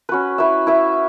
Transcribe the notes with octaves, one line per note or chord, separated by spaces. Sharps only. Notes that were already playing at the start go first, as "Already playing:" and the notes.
C#4 F#4 B4
E4 B4 E5
E4 B4 E5